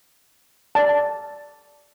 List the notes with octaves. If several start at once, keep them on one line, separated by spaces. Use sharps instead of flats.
D5 A5